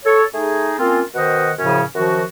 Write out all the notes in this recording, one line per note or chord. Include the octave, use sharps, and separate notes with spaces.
A4 C#5
A3 D#4 G#4
A#3 C4 C#4 F4
B2 D#3 C5 D#5 F#5
F#2 A2 C#3 F3 C#4
F#2 D#3 F3 F#4